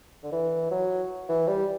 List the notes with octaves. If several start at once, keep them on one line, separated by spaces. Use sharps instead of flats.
D3
E3
F#3
E3
G3